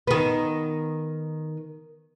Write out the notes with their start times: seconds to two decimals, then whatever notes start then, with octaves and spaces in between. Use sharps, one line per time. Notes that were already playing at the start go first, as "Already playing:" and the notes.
0.07 D#3 B3